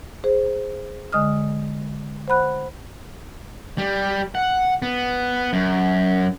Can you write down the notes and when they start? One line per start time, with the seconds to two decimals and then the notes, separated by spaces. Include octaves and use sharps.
0.24 G#4 C5
1.12 D3 G#3 D#5 D#6 F6
2.28 C5 F#5 B5 F#6
3.78 G3
4.35 F#5
4.82 B3
5.53 F#2